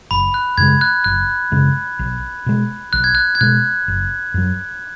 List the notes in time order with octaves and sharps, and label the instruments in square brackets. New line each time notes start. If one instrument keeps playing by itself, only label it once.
[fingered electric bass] F#1 [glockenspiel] B5
[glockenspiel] F#6
[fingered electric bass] F#2 C#3 G#3 [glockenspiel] G#6
[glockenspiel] F#6
[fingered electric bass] F#1 [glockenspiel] F#6
[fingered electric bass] F#2 C#3 G#3
B1
B2 G#3
[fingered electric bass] B1 [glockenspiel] F#6
[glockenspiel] G#6
F#6
G#6
[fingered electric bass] B2 G#3 [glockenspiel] F#6
[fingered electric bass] F#1
F#2 F#3